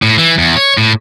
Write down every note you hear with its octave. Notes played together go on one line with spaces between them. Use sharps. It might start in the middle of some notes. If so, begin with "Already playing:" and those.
A2
E3
E2
C#5
A2